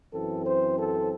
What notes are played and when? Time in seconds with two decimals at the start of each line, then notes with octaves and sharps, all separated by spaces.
0.13 F#2 E3 C4 A4
0.45 C5
0.76 A4